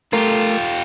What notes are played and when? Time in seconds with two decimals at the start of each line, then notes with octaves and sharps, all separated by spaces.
0.13 A3 F4 G4 A4 A#4